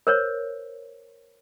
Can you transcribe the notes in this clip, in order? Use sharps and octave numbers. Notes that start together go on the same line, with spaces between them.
A#4 C5 C#5